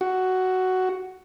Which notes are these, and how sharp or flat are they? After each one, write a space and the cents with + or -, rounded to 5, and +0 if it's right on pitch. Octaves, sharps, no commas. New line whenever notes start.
F#4 +10